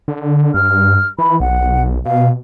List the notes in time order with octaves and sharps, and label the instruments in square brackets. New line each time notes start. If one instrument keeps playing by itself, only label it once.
[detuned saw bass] D3
[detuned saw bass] G2 [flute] F6
[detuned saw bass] E3 [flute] B5
[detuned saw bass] B1 [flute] F#5
[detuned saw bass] B2 [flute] F5